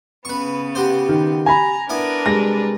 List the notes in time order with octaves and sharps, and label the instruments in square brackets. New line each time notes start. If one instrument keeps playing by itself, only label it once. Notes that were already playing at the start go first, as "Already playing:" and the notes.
[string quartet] C#3 B3 [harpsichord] B4 C#6
[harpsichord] F#4 G4 C5
[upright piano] D#3
[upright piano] G#5 B5 [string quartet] A#5
[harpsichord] B3 E4 D6 [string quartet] D4 A#4 B4
[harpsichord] C2 [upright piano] G#3 A#6